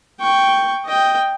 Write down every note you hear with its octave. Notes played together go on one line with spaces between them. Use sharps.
G5 C#6
D#5 G5